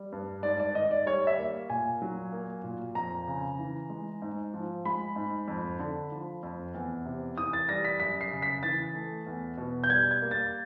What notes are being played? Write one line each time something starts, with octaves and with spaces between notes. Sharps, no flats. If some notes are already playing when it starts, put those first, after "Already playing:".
Already playing: G3
G2
G#2 D5
D5
D#3 D#5
D5
G3 C#5
E5
A#3
A#2 G#5
F#3
A#3
A#2
F2 A#5
C#3
E3
G#3
G#2
F3
G#3 B5
G#2
F2
D3
F3
F2
E2
C3
E3 D#6
A6
G3 A#6
B6
F#2 B6
C7
C#3
B6
E3 A6
A3
E2
B2
G6
G3 G#6
G#6
A#3
A6